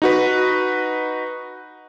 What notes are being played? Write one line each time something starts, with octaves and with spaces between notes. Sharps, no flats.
D#4 F#4 B4